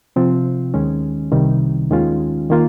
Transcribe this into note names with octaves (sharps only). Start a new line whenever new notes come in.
C3 F3 C4 F4
D#2 D#3 G#3 C#4
C2 C3 D#3 G3
D#2 D#3 G#3 C#4 F4
D#3 A#3 F4